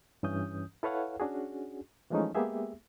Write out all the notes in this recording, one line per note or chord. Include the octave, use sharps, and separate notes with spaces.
G2 E3 C#4 D#6 G6
E4 A4 B4 C#5 F5 F#5
C#4 D4 F#4 G#4
E3 F3 G#3 A3 C#4 D#4
G#3 A#3 B3 G4 G#4 E5